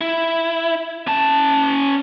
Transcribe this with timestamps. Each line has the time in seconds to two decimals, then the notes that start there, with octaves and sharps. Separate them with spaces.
0.01 E4
1.07 C#4 A5